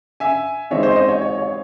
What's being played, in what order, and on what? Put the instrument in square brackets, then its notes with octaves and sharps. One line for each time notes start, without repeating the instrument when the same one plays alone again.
[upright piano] E5 G#5
E3 G#3 C4 D#4 C#5 E5
C5 D#5
C5 D#5
C#5
C#5
C#5